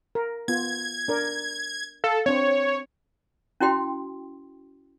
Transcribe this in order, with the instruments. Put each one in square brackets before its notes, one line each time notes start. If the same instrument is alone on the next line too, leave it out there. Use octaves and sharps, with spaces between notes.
[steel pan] A#4
[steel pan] B3 F4 [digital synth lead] G#6
[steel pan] D4 A#4 D5
[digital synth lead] A4 [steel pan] F5
[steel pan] C4 D4 C5 [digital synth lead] C#5
[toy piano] C#4 E4 F#4 G5 C6